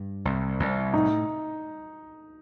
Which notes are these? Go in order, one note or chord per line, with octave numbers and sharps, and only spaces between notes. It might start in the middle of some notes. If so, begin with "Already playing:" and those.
Already playing: G2
C2
C2
A2 D#4